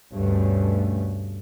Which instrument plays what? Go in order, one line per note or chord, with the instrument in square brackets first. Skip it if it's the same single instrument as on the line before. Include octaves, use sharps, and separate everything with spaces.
[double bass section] D2 G2 B2 A3 C#4